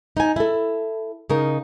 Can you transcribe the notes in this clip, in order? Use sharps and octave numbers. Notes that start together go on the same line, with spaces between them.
D#4 G#5
E4 A4
C#3 D#4 A#4